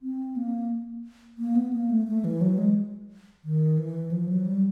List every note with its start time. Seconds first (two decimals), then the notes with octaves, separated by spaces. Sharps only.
0.02 C4
0.36 A#3
1.38 A#3
1.56 B3
1.73 A#3
1.90 A3
2.07 A3
2.24 E3
2.41 F#3
2.58 G#3
3.44 D#3
3.78 E3
4.11 F3
4.29 F#3
4.46 G3